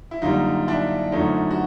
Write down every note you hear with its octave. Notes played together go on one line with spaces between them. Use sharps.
E4
F#2 D3 G3 A#3 D#4 F4
D4 E4
F#2 D3 F3 A3 C#4 D#4
F#4